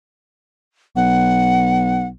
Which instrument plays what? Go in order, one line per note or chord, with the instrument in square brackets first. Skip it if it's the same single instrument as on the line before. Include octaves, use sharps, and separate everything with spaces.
[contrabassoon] B1 [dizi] F#5